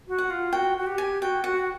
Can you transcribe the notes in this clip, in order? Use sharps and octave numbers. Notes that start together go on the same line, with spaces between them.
F#4
F#5
F4
F#4 G5
F#4
G4
G#5
F#4 G5
F#4 F#5